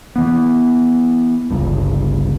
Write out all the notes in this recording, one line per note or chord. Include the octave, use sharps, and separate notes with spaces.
E3 B3
G1 C#2 G2